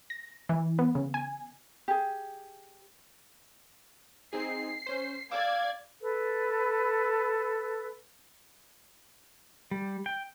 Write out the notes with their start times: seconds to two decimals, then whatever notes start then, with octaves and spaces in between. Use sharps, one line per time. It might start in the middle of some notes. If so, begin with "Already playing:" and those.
0.10 A#6
0.49 E3
0.79 B3
0.95 C#3
1.14 G#5
1.88 G4 G#4
4.33 C4 D#4 G#4 C7
4.86 C#4 C5
5.31 D5 F5 D6 E6 G#6
6.02 A4 B4
9.71 G3
10.06 G5